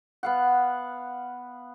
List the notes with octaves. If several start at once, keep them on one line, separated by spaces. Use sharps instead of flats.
B3 F5 F#5